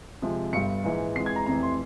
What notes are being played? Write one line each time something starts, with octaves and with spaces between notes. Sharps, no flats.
F2 C3 F3 G#3
G1 G2 G3 C#7
A#1 G#2 E3 G#3
F2 E3 G#3 C7
G#6
A#5
F1 F2 C3 E3 A#5
C6